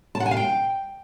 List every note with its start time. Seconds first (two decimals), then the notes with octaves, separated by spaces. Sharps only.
0.15 A5
0.20 F#5
0.26 G#5
0.31 F5
0.37 G5